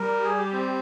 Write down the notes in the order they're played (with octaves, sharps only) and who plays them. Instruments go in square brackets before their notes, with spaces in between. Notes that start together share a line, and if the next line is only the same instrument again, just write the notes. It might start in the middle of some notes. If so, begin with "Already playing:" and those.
Already playing: [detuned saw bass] G3 [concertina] A#4
[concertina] G#4
G4
C4